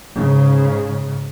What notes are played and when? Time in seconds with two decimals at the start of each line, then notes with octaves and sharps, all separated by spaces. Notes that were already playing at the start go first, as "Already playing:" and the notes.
0.16 G#2 C#3